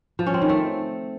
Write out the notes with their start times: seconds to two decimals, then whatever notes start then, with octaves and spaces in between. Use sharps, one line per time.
0.19 F3
0.26 C#4
0.34 C4
0.42 D#3
0.49 A3